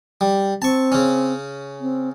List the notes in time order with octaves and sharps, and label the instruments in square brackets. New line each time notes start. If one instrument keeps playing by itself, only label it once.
[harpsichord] G3
[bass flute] C4 [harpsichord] A5 C#6
[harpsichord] C#3 C#4
[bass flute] C4